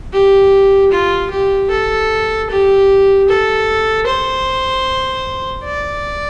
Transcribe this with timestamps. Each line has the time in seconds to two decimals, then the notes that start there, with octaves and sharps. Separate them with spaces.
0.12 G4
0.91 F4
1.30 G4
1.70 A4
2.50 G4
3.29 A4
4.06 C5
5.64 D5